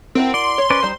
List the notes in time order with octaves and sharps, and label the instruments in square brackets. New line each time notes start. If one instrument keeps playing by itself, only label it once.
[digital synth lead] C4 [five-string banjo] E4 F#4 A#4
[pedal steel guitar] D5 [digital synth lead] C6
[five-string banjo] C#5
[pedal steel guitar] C#4 B4 D5 [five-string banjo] C5
[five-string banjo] G3 D#4 [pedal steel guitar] C5